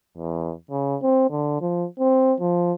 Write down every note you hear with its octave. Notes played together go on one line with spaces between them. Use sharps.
E2
C#3
C4
D3
F3
C4
F3